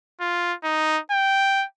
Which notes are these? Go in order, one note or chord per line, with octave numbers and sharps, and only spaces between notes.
F4
D#4
G5